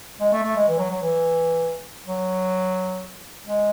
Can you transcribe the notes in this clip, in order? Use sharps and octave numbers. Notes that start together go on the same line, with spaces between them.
G#3
A3
A3
G#3
E3
F#3
F#3
E3
F#3
G#3